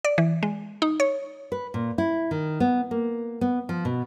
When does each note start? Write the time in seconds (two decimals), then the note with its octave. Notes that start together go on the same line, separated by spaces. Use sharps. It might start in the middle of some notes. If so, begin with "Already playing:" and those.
0.05 D5
0.18 E3
0.43 G#3
0.82 D#4
1.00 C#5
1.52 B4
1.74 A#2
1.98 E4
2.31 D#3
2.60 B3
2.91 A#3
3.41 B3
3.69 F3
3.85 B2